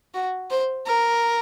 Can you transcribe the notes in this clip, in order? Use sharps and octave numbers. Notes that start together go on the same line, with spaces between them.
F#4
C5
A#4